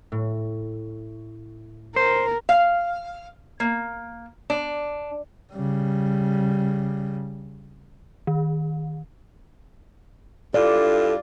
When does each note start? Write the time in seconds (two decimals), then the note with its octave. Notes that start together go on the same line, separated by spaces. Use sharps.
0.12 A2
1.96 A#4 C5
2.49 F5
3.60 A#3
4.50 D4
5.53 C#3 G3
8.27 D#3
10.54 G2 E4 F4 A4 D5